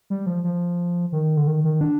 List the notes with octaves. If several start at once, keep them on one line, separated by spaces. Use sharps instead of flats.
G3
F3
F3
D#3
D3
D#3
D#3
D4